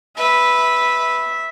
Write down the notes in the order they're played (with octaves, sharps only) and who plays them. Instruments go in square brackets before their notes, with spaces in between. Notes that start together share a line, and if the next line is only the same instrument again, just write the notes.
[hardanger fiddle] B4 [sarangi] E5